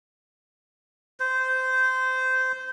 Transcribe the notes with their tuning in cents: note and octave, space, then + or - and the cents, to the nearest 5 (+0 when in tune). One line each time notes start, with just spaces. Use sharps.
C5 -15